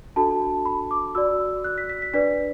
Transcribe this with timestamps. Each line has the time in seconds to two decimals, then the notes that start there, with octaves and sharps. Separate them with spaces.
0.16 D4 F#4 A4 A5
0.65 B5
0.91 D6
1.15 F#4 D5 E6
1.64 F#6
1.78 B6
1.89 B6
2.02 B6
2.14 D4 B4 D5 B6